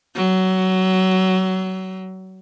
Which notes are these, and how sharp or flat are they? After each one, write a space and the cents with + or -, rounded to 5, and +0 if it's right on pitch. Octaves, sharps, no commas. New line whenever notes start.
F#3 +20